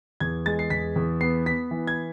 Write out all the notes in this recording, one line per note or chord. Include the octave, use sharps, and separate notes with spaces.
E2 G#6
G#3 A6
C7
E2 B6
E2
B3 C7
B3 B6
E3
G#6